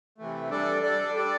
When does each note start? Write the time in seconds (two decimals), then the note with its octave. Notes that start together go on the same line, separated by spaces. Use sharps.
0.18 C3 E3 A3
0.50 G3 D4 A4 D5
0.82 G3 D4 A4 D5
1.14 G3 D4 A4 D5